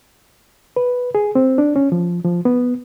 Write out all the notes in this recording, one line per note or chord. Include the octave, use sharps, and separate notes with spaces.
B4
G#4
C4
D4
C#4
F3
F3
B3